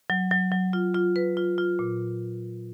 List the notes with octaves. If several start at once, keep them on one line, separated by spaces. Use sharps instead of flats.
F#3
F#3
F#3
F4
F4
B4
F4
F4
A#2